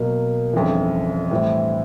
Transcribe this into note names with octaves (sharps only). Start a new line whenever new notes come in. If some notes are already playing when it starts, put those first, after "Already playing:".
Already playing: B2 F#3 A#3
G1 F2 C#3 E3
A2 E3 G3 C4 E4